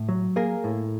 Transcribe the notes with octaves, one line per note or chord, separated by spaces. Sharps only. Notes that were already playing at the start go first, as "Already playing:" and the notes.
Already playing: A2
F#3
A#3 G#4 A#4
A2